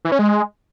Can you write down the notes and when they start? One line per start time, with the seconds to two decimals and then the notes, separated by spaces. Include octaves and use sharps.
0.05 E3
0.12 C#4
0.19 G#3